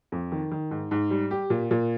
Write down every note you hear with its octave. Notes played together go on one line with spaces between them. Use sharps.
F2
D#3
D#3
G#2
G#2
G3
G4
A#2
A#2